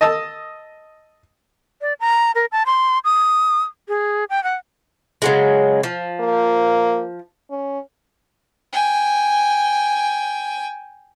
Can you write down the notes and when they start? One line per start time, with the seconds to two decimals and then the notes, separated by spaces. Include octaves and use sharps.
0.01 D#5 A5 D#6 E6
1.81 D5
2.00 A#5
2.35 A#4
2.52 A5
2.66 C6
3.04 D#6
3.88 G#4
4.30 G5
4.44 F#5
5.22 C#3 F#3 G#3
5.83 F3
6.20 A#3
7.50 C#4
8.73 G5 G#5